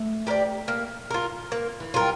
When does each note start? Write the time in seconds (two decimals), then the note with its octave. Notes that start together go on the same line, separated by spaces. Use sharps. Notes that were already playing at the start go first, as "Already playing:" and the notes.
Already playing: A3
0.27 G4 A#4
0.30 D5
0.68 A#3
1.10 F4 A#4
1.52 A#3
1.80 E3
1.94 G3 F4 A#4